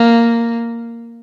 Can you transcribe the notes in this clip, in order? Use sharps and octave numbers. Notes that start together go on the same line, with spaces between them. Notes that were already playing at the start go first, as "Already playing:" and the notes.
Already playing: A#3